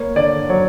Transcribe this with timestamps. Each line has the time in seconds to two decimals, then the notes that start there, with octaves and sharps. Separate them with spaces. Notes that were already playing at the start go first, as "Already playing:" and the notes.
Already playing: A#3 C#5
0.16 D3 D5
0.49 F#3 C#5